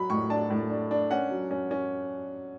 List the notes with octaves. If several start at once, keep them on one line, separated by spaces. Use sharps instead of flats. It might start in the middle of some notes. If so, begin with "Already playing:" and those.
Already playing: F#3 B5
A2 C#6
D4 A5
A2
D4
D4
C#4 F#5
F#3
C#4
C#4